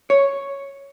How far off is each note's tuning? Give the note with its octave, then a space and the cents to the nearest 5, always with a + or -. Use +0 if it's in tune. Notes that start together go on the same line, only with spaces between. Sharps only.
C#5 +0